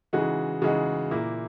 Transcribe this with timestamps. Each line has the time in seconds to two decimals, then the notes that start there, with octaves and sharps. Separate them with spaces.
0.13 C#3 E3 G#3 D#4 F#4
0.62 C#3 E3 G#3 D#4 F#4
1.11 A#2 A#3 E4